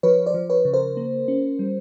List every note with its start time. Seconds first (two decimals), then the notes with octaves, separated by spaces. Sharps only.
0.03 F3 B4 C#5
0.26 C5 D5
0.34 F3
0.50 B4 C#5
0.65 C#3
0.73 A#4 C5
0.97 A#3
1.28 C#4
1.59 G3